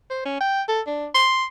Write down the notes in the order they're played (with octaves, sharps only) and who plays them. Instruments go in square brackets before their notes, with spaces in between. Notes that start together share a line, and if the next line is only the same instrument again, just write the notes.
[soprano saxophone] C5
C#4
G5
A4
D4
C6